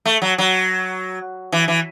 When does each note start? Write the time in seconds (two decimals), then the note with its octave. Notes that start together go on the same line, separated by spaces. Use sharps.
0.05 A3
0.22 F#3
0.38 F#3
1.52 E3
1.68 E3